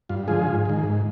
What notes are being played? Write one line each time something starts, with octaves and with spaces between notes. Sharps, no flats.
G2 F4
D3 F3 G#3 F4 G#4
G#2
D#3 G#3
G#2